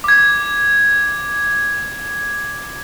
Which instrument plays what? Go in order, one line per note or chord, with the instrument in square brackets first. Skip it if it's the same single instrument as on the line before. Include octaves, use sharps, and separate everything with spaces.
[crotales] D6 G#6